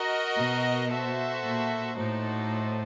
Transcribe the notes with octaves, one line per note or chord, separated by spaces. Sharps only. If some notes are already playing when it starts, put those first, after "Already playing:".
Already playing: F#4 A#4 D#5
B2
F#4 A4 C5 E5
A#2
A2 D#4 F#4 A4 C5